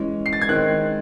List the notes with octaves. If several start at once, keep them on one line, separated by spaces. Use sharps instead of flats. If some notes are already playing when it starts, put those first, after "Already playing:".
Already playing: E3 G#3 C#4
C7
A6
G#6
D#3 G#3 C4 F#6